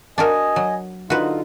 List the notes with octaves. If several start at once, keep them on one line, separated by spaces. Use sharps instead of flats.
D4 F#4 A#4 D#5 G#5
F#3
D3 D#4 F4 F#4 B4